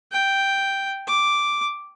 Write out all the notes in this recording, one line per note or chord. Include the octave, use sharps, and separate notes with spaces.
G5
D6